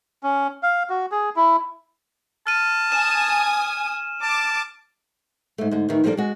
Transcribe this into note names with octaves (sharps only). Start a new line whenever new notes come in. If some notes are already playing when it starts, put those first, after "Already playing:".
C#4
F5
F#4
G#4
E4
A5 F6 D#7
G#5 D#6 E7
A5 D6
G#2 A3
G#2 D3
A2 D#3 E3
F3 G3 A#3 D4 A4 D5
G#3 F#4